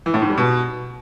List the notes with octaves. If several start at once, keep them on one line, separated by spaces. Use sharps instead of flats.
E3
A2
G#2
G3
B2